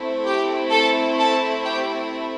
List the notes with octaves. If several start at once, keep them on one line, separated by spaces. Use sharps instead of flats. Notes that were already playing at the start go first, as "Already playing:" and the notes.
Already playing: A3 C4 E4
G4 G5
A4 A5
A4 A5
G4 G5